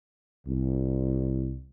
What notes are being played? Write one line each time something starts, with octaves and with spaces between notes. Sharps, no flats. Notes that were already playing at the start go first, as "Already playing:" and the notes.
C2